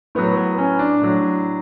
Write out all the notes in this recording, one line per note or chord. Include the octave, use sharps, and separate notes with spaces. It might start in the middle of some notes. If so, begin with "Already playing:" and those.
A2 F#3 B3
B3
C#4
D4
A2 F#3